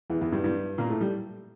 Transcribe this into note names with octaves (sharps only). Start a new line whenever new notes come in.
E2 E3
E2 E3
G2 G3
G2 G3
A#2 A#3
A2 A3
G3